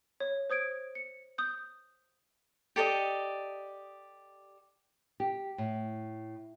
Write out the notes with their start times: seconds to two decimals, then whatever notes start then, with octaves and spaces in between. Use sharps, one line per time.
0.20 C#5
0.50 C5 D#6 G#6 D7
0.95 C#7
1.38 D#6 G6
2.76 G4 A4 D5 D#5
5.20 G4
5.58 A2